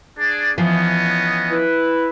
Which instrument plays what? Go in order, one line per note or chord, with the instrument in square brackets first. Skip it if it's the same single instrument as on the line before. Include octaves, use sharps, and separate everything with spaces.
[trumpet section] D4 G#4 D5
[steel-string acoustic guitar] E3 F3 [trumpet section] B3 C#4 D#5
[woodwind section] E4 B4